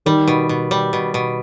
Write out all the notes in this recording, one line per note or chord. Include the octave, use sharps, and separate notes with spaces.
D#3 G3
B2
B2
G3
B2
B2